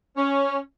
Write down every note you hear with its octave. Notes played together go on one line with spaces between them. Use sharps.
C#4